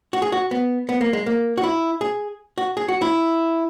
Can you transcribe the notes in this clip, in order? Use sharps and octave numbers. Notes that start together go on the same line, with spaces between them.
F#4
G#4
F#4
B3
B3
A#3
G#3
A#3
F#4
E4
G#4
F#4
G#4
F#4
E4